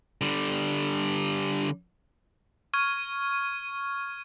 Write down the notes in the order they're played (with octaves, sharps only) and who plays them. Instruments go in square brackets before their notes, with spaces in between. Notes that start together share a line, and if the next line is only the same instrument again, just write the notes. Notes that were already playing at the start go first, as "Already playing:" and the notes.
[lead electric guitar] D3 G3
[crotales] C#6 F6 G#6 D#7